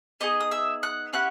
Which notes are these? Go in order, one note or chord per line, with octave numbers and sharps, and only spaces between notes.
B3 D#4 G#4 D#5 D#6
D#6
E5 E6
F#5 F#6
C#4 E4 G4 F#5 F#6